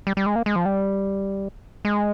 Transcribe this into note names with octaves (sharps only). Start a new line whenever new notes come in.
G3
G3
G#3
A#3
G#3
F3
G3
G#3